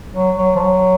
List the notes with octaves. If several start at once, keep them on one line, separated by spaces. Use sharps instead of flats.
F#3
F#3
F3
F#3